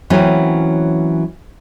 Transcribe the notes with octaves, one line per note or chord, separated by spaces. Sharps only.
E3 F#3 A3 C4 C#4